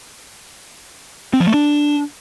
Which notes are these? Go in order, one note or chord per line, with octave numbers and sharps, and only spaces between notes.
C4
F3
A3
D4